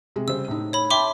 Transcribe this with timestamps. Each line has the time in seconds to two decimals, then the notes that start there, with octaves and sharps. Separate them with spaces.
0.16 C3 G#3
0.28 C#3 G3 C5 E6
0.48 A2 D#4
0.73 C#5 B5
0.90 E5 G5 A5 B5 C6 D6